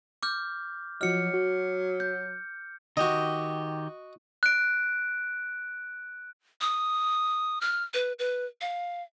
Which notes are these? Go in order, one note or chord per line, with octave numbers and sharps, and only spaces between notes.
D6 F6 G6
F3 F#3 F#4 D#5 F6 C#7
F#4
G6
D#3 F#4 G4 D#5
F#6 D7
D#6
F6
B4
B4
F5